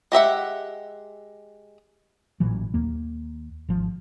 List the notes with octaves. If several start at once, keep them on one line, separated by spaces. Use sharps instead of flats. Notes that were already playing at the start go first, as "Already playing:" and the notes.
G#3 G4 E5 F#5
A1 A#2 E3 F#3
D#2 A#3
G#1 F3